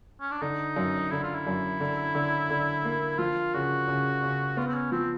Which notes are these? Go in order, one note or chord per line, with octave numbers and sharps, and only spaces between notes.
C#4
D4
D3 D#4
F#2
D3 E4
F4
E4
F#2
D3
D3
D3
A#3
F3 F4
C#3 F#4
C#3
C#3
B3 F4
C4
C#4
F3 C4